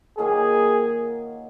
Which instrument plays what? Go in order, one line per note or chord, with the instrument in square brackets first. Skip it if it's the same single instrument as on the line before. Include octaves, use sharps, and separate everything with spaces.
[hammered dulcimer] D#3 F#3 A#3 F4 [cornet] G#4